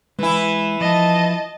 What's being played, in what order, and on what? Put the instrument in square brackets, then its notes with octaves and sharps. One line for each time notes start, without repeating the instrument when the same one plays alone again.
[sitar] E3 E4 [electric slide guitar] G#3 G#5
[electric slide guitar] F3 [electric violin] D#5 A5